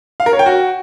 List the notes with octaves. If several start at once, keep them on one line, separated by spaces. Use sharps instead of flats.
F5
A#4
C#5
G5
F#4